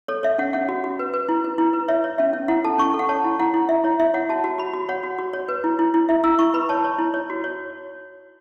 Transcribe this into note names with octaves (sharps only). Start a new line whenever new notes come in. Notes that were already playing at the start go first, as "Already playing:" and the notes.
A4 C#5
C#5 E5
C#4 F#5
C#4 F#5
F#4
F#4
B4
B4
E4
B4
E4
B4
C#5 E5
C#5
C#4 E5
C#4
E4 F#5
A4 A5
C#4 C#6
A4
F#5
C#5 A5
E4
E4 F#5
E4
E4 E5
E4 C#5
E4 E5
C#5 F#5
F#4 A5
F#4
F#4 B5
F#4
C#5 F#5
F#4
F#4
C#5
B4
E4
E4
E4
E4 E5
E4 E6
E4 C#6
B4 B5
C#5 A5
C#5
E4
C#5
F#4
C#5